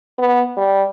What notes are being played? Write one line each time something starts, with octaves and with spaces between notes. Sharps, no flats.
B3
G3